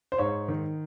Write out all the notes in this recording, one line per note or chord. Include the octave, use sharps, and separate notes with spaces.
C5
G#2 C#5
D#3